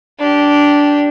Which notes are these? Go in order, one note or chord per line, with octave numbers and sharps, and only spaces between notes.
D4 G4